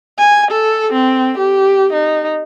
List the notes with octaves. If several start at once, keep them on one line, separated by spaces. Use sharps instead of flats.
G#5
A4
C4
G4
D#4